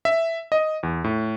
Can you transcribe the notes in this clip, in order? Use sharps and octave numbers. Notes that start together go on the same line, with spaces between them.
E5
D#5
E2
A2